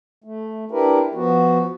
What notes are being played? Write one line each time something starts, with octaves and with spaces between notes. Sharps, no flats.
A3
D4 E4 G4 A#4 B4
F3 B3 F#4